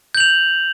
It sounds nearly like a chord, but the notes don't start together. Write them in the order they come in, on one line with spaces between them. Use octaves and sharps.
G6 F#7 F7